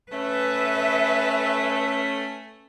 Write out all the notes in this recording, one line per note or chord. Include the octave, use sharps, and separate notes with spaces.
A3 C#4 B4 E5